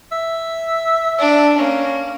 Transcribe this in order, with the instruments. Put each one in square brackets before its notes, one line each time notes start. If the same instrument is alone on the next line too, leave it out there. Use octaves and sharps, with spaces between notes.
[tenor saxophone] E5
[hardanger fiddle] D4
[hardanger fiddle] A#3 [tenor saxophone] C#4